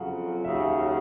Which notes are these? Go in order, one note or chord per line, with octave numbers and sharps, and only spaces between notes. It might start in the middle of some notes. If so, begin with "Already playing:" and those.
Already playing: F2 C#3 F#3 F#5
D#2 C#3 F#3 E5